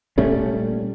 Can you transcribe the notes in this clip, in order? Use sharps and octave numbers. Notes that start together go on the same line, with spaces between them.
A#2 G3 A3 C#4